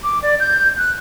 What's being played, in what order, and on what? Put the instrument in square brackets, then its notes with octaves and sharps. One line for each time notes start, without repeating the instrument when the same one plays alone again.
[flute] D6
D5
G6
F#6